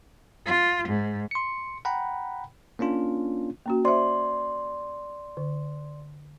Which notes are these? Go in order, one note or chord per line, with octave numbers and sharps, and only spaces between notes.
F4
G#2
C6 C#7
F#5 G5 A#5 B5
A#3 C#4 D4 F4
A#3 C#4 F#4
C5 D5 E5 C6
D3